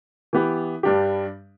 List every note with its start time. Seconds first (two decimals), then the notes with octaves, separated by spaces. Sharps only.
0.33 E3 B3 G4
0.83 G2 G3 D4 G4